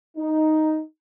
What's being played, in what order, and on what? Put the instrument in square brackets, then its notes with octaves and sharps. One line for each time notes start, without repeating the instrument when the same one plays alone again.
[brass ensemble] D#4